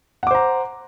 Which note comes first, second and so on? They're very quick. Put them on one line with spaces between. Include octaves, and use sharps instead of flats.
F#5 D6 C5 A#5